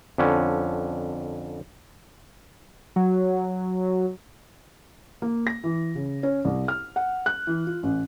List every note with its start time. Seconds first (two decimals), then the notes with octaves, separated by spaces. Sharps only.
0.18 F2 D3 C#4
2.96 F#3
5.22 A#3
5.47 A#6
5.64 E3
5.95 C#3
6.23 C#4
6.45 C2
6.68 F6
6.96 F#5
7.26 F#6
7.47 E3
7.67 F4
7.83 A1